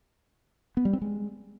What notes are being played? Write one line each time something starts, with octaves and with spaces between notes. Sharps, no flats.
B3
G3
C4
G#3